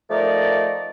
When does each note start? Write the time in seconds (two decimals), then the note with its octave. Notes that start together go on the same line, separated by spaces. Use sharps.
0.11 F3 A3 D#4 A#4 D5